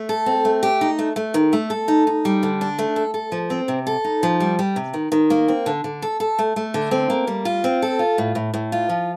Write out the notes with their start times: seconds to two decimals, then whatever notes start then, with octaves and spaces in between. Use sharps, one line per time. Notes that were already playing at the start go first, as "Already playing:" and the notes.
Already playing: A3
0.09 A4
0.26 C4
0.45 A3
0.63 G4
0.81 D#4
0.99 A3
1.16 A3
1.34 D#3
1.53 A3
1.70 A4
1.88 D#4
2.07 D#4
2.25 G3
2.43 D3
2.61 D4
2.79 A3
2.96 A4
3.14 A4
3.32 F3
3.50 C4
3.68 C3
3.87 A4
4.04 D#4
4.23 F3
4.40 G3
4.59 G3
4.76 C3
4.94 D#3
5.12 D#3
5.30 A#3
5.48 C4
5.66 D3
5.84 D3
6.02 A4
6.20 A4
6.39 A3
6.56 A3
6.74 D3
6.91 C4
7.10 A#3
7.27 G3
7.45 F4
7.64 C4
7.82 A4
7.99 F4
8.18 A2
8.35 A2
8.54 A2
8.72 F4
8.89 F3